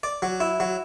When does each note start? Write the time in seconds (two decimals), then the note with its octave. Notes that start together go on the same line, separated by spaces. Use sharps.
0.03 D5
0.22 F#3
0.40 E4
0.60 F#3